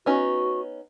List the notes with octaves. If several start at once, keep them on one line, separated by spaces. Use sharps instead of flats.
B3 C#4 D#4 F#4